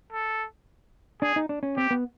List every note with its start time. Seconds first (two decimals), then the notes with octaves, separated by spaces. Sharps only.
0.13 A4
1.22 D4 G#4
1.36 D#4
1.49 D4
1.63 C#4
1.77 C4 G4
1.91 B3